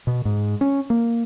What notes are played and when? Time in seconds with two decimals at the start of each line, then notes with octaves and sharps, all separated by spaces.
0.07 B2
0.25 G#2
0.61 C#4
0.90 A#3